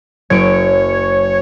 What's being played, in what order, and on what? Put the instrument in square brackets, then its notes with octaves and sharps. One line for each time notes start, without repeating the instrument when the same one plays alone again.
[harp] F#1 D7 [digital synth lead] C#5